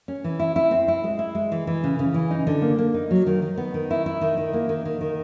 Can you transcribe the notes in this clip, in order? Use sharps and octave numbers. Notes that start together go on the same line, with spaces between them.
C#4
E3
E4
E4
C4
E4
G#3
E4
G#3
E3
E3
C#3
C#3
E3
D#4
D3
A#3
A#3
D#4
F#3
D#3
D#3
B3
D#3
E4
E4
D#3
D#3
A#3
D#3
D#3
D#3